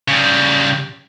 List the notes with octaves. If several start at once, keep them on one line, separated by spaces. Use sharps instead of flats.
C#3 G3